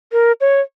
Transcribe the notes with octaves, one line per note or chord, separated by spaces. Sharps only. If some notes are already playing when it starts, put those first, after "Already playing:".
A#4
C#5